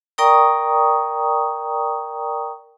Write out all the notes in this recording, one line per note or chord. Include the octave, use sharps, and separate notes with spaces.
A#4 D5 G5 A#5 C#6 D#6